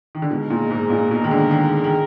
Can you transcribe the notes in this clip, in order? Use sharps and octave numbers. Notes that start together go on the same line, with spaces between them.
D#3
D3
B2 G#3 D#4 A#4
A#2
G#2
A#2
B2
D#3
D3
D#3
D#3